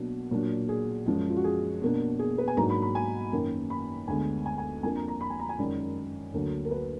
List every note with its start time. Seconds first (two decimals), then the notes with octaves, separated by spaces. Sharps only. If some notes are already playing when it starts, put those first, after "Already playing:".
Already playing: B2 F#3 A#3 D4
0.31 A#2 F#3 D4
0.69 G#4
1.06 F#2 F3 G#3
1.30 F4
1.36 F#4
1.44 G#4
1.82 B2 A#3 D4
2.19 G#4
2.38 B4
2.48 G#5
2.57 G#2 F#3 A#3 D4 A#5
2.70 B5
2.82 B5
2.95 G#5
3.33 F#2 D#3 A#3
3.70 B5
4.08 D2 D3 G#3 B3 G#5
4.46 G#5
4.58 G#5
4.83 F2 F3 A#3 D4 G#5
4.96 A#5
5.08 A#5
5.21 B5
5.30 G#5
5.39 A#5
5.49 G#5
5.59 F#2 D#3 G#3 D5
6.34 D2 D3 F#3 A#3 D4
6.65 A#4
6.71 B4